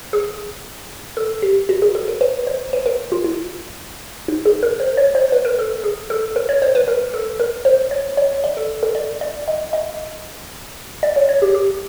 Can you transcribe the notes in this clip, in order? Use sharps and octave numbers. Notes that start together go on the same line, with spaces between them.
G#4
A4
G4
F#4
G#4
A4
A#4
B4
C5
B4
A#4
F4
E4
D#4
G#4
A#4
C5
C#5
C5
B4
A#4
A4
G#4
A4
A#4
C#5
C5
B4
A#4
A4
A#4
C5
C#5
C#5
D5
A4
A4
D5
D5
D#5
D#5
D5
C#5
C#5
G4
G4